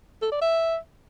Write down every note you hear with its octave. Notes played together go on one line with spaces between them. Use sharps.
A4
D5
E5